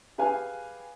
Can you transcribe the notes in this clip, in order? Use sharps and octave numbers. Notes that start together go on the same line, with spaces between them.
G4 G#4 B4 F5 G#5